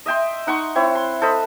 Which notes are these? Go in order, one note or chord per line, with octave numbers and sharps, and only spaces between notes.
D#5 E5 G5 C6
D#4 F#5 C6 C#6
C4 E4 C#5
C6
A4 C5 D#5 B5